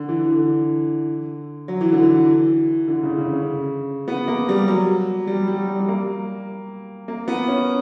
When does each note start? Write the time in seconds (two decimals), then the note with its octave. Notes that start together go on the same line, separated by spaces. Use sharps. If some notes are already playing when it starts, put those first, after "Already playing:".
Already playing: D3
0.09 E3
0.29 D3
1.68 F#3
1.81 E3
1.92 D3
2.03 E3
2.88 D3
3.03 C#3
3.18 C#3
3.33 C#3
4.08 B3
4.28 A#3
4.49 G3
4.68 F#3
5.27 G3
5.48 G3
5.68 G3
5.80 G3
5.88 A#3
7.08 A#3
7.28 B3
7.48 C#4